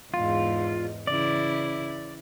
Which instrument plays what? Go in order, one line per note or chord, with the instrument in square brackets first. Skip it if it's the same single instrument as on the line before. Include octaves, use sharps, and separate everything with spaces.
[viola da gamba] E2 G#2 [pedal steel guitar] F4
[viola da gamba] C#3 E3 E4 [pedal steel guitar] D5